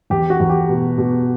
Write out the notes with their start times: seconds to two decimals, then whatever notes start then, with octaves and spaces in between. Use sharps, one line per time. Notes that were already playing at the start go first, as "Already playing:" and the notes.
0.10 E2 G4
0.30 F#4
0.40 E2
0.50 G4
0.69 B2
0.98 B2